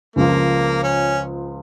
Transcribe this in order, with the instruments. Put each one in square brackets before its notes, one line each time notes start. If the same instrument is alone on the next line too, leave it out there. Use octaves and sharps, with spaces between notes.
[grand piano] C#2 C#3 F3 [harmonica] A#3
[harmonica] C#4